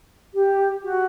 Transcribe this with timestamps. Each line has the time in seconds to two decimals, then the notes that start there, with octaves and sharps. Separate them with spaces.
0.34 G4
0.84 F#4